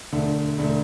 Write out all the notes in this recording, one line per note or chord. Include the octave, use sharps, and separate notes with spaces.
E1 D2 D3 A3 D4
E1 D3 A3 D4